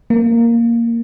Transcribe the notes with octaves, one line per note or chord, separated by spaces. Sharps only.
A#3